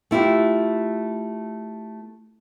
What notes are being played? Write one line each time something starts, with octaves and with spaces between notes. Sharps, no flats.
A3 E4 F4 G4